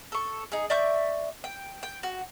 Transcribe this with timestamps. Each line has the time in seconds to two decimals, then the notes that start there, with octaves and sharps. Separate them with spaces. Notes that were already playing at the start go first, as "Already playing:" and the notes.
0.12 A4 C#6
0.52 D#4 G#4
0.70 D5 E5 C#6 G6
1.44 G5
1.83 G5
2.03 F#4